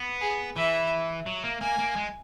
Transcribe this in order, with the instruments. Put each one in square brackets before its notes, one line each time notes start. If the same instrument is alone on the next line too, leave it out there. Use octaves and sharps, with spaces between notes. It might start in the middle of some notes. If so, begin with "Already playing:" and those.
Already playing: [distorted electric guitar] B3
[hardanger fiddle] G#4
[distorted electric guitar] E3 [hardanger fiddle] E5
[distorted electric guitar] F#3
A#3
[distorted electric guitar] A#3 [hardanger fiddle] G#5
[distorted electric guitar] A#3
G#3